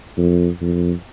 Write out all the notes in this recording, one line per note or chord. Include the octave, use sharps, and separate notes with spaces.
F2
F2